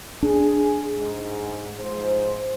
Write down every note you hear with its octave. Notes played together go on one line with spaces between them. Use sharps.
D4 G#4
G#2
G#2 F3 C5